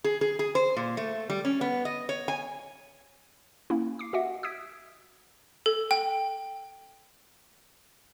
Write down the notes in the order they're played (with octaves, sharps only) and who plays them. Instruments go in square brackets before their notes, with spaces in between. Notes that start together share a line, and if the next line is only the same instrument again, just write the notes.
[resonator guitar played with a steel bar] G#4
G#4
G#4
C5
A#2
A3
G3
C#4
B3
D#5
C#5
G#5
[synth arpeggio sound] A#3 C#4 E4
D6 C7
F#4 G4 D#5 E5 F#5
D#6 E6 G#6 B6 D7
[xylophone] A4
G5